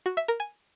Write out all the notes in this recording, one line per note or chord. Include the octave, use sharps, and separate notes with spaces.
F#4
E5
A#4
G#5